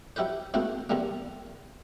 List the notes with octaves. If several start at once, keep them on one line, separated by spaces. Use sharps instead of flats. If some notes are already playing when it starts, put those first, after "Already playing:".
F#3 E4 G4 B4 C5
G#2 A3 A#3 C4 E4 F#4
E2 D3 G3 A#3